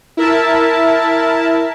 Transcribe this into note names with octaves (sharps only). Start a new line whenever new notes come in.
E4 A#4 E5 A5